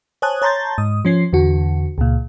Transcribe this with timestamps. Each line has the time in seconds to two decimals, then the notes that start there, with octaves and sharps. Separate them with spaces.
0.22 C5 C#5 G#5 A5 D#6 F#6
0.42 C#5 A5 A#5 C6 G6 A6
0.78 G#2 D#6
1.05 F3 C#4 C7
1.33 E2 D3 F#4
1.98 C#2 A#2